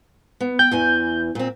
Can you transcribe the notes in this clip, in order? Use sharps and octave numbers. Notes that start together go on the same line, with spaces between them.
B3
G5 G6
E2 E3 G#5
A#2 C4